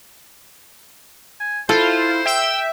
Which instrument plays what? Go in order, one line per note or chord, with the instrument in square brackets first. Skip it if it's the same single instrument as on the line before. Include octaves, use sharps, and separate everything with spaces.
[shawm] G#5
[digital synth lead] E4 [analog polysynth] F4 [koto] A4 [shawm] C5
[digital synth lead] E5 [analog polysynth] G5 E6